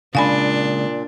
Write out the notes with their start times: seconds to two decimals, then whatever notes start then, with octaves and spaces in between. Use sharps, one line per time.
0.15 A#2 C#3 G#3 D4 F5 G#5 B5